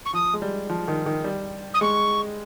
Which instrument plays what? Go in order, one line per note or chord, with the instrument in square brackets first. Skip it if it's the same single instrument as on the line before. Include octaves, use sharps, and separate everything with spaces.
[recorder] C#6
[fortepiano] F3 [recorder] D#6
[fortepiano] G#3
G3
F3
D#3
D#3
G3
[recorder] D#6
[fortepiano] G#3 [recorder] C#6